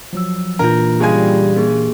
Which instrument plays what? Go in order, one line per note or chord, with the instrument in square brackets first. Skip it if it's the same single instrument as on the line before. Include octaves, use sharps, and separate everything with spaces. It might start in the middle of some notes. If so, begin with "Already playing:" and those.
[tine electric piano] F3 F#3 E6
[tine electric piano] A#2 E3 D4 [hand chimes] A#3 F4 [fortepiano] A#4
[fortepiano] C#3 G#3 G#5 [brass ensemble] G3
[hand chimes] A#3 G4 G#4